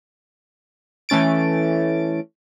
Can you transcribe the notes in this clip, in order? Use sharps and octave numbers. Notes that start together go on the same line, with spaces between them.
E3 A3 C#4 A6 D7